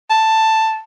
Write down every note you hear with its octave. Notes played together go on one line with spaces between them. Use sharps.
A5